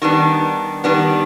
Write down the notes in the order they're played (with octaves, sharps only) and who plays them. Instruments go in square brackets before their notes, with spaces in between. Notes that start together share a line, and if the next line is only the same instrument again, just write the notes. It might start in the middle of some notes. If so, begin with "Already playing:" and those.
[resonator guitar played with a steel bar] D#3 G3 B3 D4
D#3 G3 B3 D4